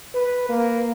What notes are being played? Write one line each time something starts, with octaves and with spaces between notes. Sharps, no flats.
B4
A#3